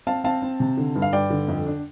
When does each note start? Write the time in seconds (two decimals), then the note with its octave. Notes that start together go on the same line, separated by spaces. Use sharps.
0.07 C4 F5 A5
0.24 C4 F5 A5
0.42 C4
0.60 C3
0.77 D3
0.95 G2
1.02 F5
1.13 G2 D5 G5
1.30 D3
1.48 F2
1.67 D4